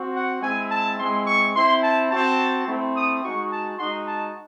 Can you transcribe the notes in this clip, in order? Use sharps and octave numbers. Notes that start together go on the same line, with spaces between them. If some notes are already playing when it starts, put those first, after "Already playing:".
Already playing: C4 F#4
F#5
G#3 C4 E4 G#5
A5
G#3 C4 E4 C6
C#6
C4 E4 C6
A5
C4 F#4 A5
A3 C4 E4
D#6
G#3 D#4 F#4 C#6
A5
G#3 D#4 F#4 C6
A5